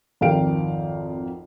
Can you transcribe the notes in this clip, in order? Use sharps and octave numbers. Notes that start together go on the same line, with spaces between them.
G#1 F2 A#4 F5 G5 D7